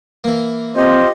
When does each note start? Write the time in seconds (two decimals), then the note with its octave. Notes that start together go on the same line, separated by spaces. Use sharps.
0.24 E3 A#3
0.76 C4 F4 G4 C5 D#5